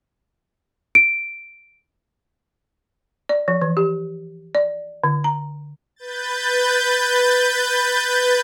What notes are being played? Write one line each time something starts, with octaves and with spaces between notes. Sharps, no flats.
D7
D5
F3
E3
G4
D5
D3
A#5
B4 G6 A6